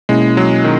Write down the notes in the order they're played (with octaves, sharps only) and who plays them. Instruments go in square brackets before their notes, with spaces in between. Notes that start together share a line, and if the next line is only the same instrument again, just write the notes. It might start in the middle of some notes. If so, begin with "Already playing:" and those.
[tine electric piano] B2 A#3 C#4 E4 [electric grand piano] G#3
[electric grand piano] F#3
D#3